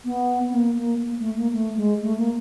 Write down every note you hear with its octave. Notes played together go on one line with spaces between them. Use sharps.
B3
B3
A#3
A#3
A#3
A3
A#3
A3
G#3
A3
A#3